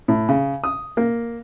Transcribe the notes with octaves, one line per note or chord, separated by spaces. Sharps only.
A2
C#3
D#6
A#3